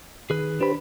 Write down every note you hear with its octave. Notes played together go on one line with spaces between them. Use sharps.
D#3 G#4 B4
D4 G4 B4 C5 B5